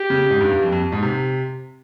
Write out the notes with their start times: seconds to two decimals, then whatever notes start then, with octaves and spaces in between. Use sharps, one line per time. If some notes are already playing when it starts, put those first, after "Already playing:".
Already playing: G4
0.10 C#3
0.30 G#2
0.41 G2
0.51 G2
0.62 F2
0.72 F2
0.92 G#2
1.02 C3